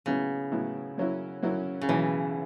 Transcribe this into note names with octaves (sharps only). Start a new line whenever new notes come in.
A2 C#3 F#3 B3 E4
A2 F#3 B3 E4
F#2 F#3 C#4 E4
F#2 F#3 C#4 E4
C#3
B1 B2 E3 F#3 B3 E4